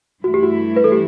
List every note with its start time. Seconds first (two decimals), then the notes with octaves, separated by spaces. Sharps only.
0.24 G2 E3 A3 E4 F#4
0.34 G4
0.43 F#4
0.76 B4
0.84 A4
0.92 G4